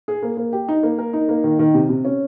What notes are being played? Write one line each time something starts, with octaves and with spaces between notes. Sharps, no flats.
G#4
A#3
A#3
G4
D#4
A#3
A#4
D#4
A#3
D#3
D#3
C3
C3
C#4